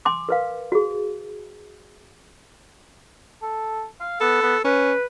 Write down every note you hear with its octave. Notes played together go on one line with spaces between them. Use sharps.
G#5 C6 D6
A#4 B4 F5
F#4 G#4
A4
F5
B3 A4
B3
C#4 B4